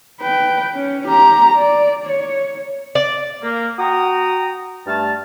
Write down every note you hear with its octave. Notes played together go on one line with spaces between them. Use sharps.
B4 G5
C#4
G4 A#5
D5
C#5
D5
A#3
F#4 G5 A#5 D#6
G2 A3 A5 F6